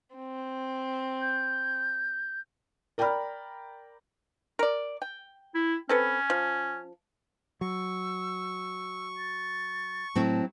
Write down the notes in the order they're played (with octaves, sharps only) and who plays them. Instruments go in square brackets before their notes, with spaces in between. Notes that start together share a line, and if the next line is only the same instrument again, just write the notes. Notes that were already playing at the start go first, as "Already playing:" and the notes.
[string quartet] C4
[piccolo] G6
[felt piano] A#4 D5 G5 A#5 B5 F6
[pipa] A#4 D5
G5
[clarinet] E4
[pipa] C4 A4 B4 [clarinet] C#4
[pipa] F3
[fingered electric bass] F#3 [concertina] C#6 [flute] E6
[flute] A6
[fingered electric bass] A2 A3 [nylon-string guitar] F#3 C4 E4 [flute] A5